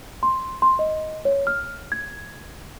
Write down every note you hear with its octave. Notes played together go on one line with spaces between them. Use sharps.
C6
C6
D#5
C#5
F6
G#6